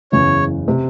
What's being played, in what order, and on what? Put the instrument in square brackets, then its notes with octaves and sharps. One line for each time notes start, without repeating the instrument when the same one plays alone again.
[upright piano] F#1 E2 C#3 [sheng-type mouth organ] C#5
[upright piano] C3